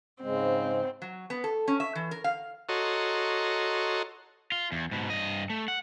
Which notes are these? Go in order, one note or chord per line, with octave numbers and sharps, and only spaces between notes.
G#2 C#3 G#3 C4
F#3
B3
A4
C#4
E5
E3
A#4
F5
F#4 A4 C#5 D#5 A#5 C6
F4
E2
G#2 B2
G2 D#5
A3
F#5